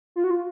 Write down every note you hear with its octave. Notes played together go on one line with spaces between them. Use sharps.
F4
F#4
F4